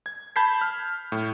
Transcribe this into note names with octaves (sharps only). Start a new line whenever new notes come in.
G#6
A5 B5 G6 G#6 B6 C7
F6
A2